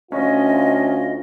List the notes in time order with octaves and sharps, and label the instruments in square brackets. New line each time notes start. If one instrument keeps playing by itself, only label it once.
[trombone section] D2 F4 [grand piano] C#4 [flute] D#5